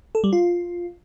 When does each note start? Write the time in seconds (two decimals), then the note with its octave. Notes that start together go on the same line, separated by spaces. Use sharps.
0.15 A4
0.24 G3
0.33 F4